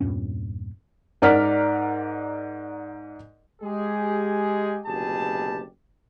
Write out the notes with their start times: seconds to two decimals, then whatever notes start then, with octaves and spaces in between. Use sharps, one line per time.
0.01 E2 G2 A#2 C#4
1.22 G#2 A#4 D5 F#5 F6 B6
3.62 G#3 G4 G#4
4.87 F#1 D2 B2 G4 G#4 A5